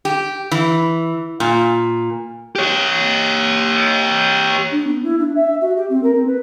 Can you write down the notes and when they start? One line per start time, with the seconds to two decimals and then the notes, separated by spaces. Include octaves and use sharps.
0.05 G4
0.51 E3
1.40 A#2
2.56 G4 C#5
4.71 D4
4.87 B3
5.03 E4
5.18 D4
5.35 E5
5.61 F#4
5.76 G4
5.89 C4
6.03 A#4
6.14 C4
6.26 B4